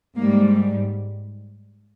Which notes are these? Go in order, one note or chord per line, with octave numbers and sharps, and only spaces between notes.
G#2 G3 A#3